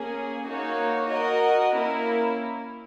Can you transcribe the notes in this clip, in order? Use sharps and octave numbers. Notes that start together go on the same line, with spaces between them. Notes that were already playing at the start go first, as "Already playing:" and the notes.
Already playing: A#3 C#4 G#4
A#3 D#4 F#4 C#5
F#4 A#4 D#5
A#3 C#4 E4 A#4